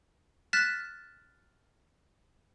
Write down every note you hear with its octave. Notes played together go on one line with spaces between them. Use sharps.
F6 F#6 A6 B6 E7